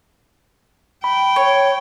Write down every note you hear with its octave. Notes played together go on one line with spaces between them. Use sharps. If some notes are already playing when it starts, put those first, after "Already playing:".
G5 B5
C#5